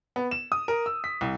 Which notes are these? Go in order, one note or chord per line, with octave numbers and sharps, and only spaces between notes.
B3
E7
D#6
A#4
E6
B6
C2